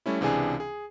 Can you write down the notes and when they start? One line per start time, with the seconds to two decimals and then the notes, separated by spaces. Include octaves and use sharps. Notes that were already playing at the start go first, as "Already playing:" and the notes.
0.06 G3 A3 C#4 E4
0.21 C#2 C3 E3 D4 G#4 G#5
0.60 G#4